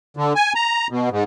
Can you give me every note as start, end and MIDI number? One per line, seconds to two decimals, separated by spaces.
0.17 0.33 50
0.36 0.53 80
0.55 0.87 82
0.91 1.09 47
1.11 1.24 44